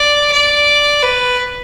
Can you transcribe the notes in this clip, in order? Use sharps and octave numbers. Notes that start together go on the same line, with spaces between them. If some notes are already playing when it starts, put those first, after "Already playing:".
Already playing: D5
D5
B4